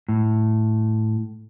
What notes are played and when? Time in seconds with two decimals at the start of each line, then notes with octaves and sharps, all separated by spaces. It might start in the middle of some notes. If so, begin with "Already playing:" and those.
0.09 A2